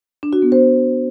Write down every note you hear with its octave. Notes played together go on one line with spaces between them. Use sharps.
D4
F#4
B3
C5